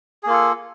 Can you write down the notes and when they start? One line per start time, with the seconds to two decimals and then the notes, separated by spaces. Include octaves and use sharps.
0.23 G#4
0.26 A#3
0.30 F4
0.33 A4